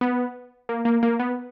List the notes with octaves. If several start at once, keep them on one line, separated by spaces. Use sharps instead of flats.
B3
A#3
A#3
A#3
B3